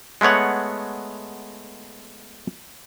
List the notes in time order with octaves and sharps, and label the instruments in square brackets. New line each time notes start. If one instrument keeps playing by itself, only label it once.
[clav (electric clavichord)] G#3 A3 B3 C#5 F#5